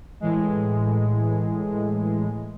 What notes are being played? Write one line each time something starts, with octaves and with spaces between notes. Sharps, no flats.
A2 E3 G#3